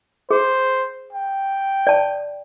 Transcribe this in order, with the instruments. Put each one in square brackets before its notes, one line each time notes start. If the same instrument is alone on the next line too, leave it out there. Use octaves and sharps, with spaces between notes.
[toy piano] G#4 [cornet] C5
[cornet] G5
[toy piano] D5 A5